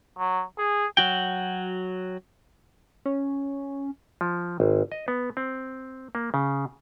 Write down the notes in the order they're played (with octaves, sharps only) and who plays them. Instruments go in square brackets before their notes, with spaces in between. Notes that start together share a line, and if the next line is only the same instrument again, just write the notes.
[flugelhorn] F#3
G#4
[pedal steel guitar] F#3 F#4 G5
[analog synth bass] C#4
[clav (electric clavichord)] F3
G#1
D#5
B3
C4
A#3
C#3